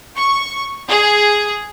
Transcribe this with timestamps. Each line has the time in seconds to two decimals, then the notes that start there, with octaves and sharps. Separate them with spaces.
0.15 C#6
0.88 G#4